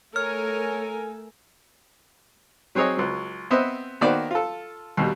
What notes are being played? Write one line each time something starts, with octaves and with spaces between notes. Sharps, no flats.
A3 A4 A#4 C#5 G#5 F6
F#3 C4 G#4 C#5 D#5
C#2 F#3
B3 C4 C5 D#5 E5
D#3 A#3 B3 F#4 C5 D5
F4 A4
D#2 B2 G3